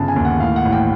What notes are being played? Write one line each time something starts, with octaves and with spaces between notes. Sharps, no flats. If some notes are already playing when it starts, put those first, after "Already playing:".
Already playing: G1 C#3 A5
G#5
D#2
F#5
A2 F5
F#5
A1
G5